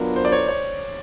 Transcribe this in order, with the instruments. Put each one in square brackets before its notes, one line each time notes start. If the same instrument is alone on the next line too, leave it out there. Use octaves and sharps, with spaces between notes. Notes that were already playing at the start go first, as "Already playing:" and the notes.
Already playing: [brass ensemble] F#3 B3 D4 F4 A#4
[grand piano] C5
D5
C#5
C#5